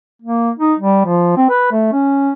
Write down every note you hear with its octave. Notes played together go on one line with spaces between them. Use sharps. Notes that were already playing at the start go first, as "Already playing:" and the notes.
A#3
D#4
G3
F3
C4
B4
A3
C#4